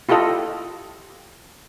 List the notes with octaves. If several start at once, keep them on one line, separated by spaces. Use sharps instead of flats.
E4 F4 G4 A4 D#5